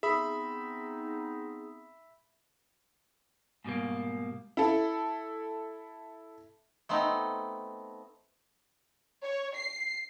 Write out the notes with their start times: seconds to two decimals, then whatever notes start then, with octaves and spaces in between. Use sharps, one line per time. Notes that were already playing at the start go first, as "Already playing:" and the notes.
0.03 B3 C4 D#4 G#4 E5 B5
3.65 G#2 B2 G3 A#3
4.57 E4 A4
6.89 A3 B3 C4 D#4
9.23 C#5
9.55 C7